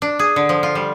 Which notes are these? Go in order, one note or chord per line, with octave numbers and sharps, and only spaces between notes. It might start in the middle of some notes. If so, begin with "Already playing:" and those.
D4
G#4
D3
F3
F4
G3